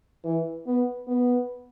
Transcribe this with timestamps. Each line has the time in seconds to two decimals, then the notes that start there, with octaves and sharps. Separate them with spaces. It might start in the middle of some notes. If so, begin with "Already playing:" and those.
0.24 E3
0.67 B3
1.08 B3